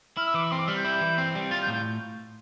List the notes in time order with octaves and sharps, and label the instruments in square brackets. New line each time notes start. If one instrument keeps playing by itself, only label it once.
[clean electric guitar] E4 [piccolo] F6
[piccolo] E6
[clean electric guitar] E3 [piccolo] D6
[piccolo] E6
[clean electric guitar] C4 [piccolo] C6
[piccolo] D6
[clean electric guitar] G3 [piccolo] F6
[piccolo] G6
[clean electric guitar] E4
E3
C4
G3
[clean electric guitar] F4 [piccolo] A6
[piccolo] G6
[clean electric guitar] A2
[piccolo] G6